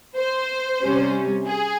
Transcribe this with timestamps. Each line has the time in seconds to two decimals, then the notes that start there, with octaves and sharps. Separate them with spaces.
0.16 C5
0.81 C3 G3 C#4
1.47 G#4